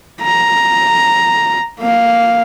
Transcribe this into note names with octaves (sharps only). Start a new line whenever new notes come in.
A#5
A#3 F5